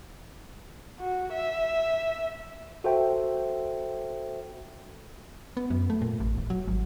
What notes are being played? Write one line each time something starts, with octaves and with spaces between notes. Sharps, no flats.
F#4
E5
F#4 A4 C5 E5 G5
B3
F#2
A3
A#2
A1
E1
F#3
G#1